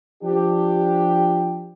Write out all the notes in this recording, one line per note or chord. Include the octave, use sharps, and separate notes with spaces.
F3 D4 G4